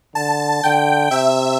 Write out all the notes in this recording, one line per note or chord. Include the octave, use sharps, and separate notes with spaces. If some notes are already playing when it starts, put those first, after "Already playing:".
D3 A5
D3 G5
C3 E5